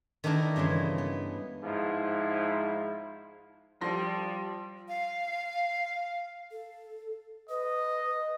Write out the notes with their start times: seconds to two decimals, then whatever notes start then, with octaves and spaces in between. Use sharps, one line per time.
0.24 D#3 A3 B3 D4 E4 A#4
0.56 G2 C#3 E3 G#3
0.98 B3
1.64 G#2 F3 E4
3.81 F3 G3 C6 A#6
4.89 F5
6.51 A4
7.49 B4 D#5